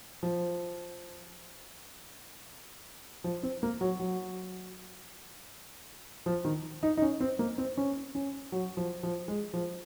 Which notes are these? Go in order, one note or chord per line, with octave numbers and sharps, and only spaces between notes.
F3
F3
C4
A#3
F#3
F#3
F3
D#3
D#4
D#4
C#4
C4
A#3
C4
C#4
C#4
F#3
F3
F3
G#3
F3